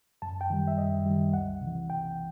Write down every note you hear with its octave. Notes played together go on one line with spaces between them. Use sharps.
F#2 A5
G5
D#3 G3
E5
F#2 D#5
D#3 G3
C2 F#5
C3 E3
C2 G5